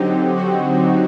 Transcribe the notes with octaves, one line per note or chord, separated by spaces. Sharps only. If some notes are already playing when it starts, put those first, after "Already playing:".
Already playing: D3 F#3 C4 D#4 G4
F#4